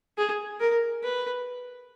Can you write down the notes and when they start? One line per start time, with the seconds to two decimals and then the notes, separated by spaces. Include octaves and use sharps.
0.18 G#4
0.60 A#4
1.03 B4